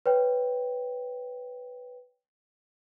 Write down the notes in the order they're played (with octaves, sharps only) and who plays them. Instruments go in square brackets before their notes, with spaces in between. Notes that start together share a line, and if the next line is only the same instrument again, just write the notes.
[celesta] B4 C#5 G5